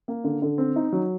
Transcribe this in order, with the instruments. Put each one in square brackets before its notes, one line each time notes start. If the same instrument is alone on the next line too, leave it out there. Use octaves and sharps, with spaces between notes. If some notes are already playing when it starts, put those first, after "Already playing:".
[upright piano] A#3
D3
D3
C4
D#4
F#3